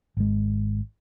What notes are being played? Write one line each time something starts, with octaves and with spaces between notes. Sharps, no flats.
G#1 G#3